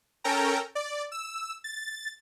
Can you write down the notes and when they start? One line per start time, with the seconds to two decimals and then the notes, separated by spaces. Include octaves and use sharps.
0.24 C#4 A4 A#4 G5 A#5
0.75 D5
1.12 E6
1.64 A6